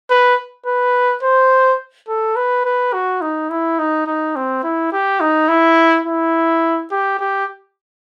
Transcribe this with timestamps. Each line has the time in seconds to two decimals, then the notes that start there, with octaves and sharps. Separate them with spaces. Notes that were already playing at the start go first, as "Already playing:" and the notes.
0.10 B4
0.66 B4
1.23 C5
2.09 A4
2.36 B4
2.65 B4
2.94 F#4
3.22 D#4
3.50 E4
3.79 D#4
4.07 D#4
4.36 C4
4.63 E4
4.93 G4
5.21 D#4
5.49 E4
6.06 E4
6.92 G4
7.19 G4